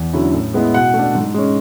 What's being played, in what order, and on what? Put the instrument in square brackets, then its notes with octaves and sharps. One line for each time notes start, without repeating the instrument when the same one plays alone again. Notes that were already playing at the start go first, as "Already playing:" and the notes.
Already playing: [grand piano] E2
D3 F#3 C#4 E4
A2
G#3 B3 E4
B2 F#5
A3
D4
G#2
G#3 C#4